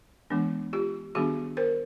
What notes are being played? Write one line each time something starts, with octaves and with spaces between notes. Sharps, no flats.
E3 G#3 B3 D4
F4 G4
D#3 G3 B3 D4 F#4 G#4
A#4 C5